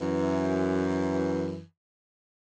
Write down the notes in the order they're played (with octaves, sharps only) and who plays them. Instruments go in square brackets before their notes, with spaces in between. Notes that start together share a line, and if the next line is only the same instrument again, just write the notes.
[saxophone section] F#2 E3